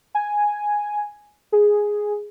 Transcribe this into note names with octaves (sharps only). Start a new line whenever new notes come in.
G#5
G#4